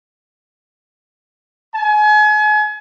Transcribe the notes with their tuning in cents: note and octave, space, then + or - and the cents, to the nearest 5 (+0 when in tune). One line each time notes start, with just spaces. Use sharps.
G#5 +35